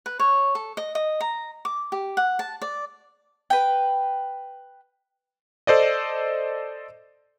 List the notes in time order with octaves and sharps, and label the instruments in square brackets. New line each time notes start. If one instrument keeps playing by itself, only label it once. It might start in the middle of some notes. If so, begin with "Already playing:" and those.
[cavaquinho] B4
C#5
A4
D#5
D#5
A#5
D6
G4
F#5
A5
D5
[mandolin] B4 G5
[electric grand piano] A4 C5 D5 D#5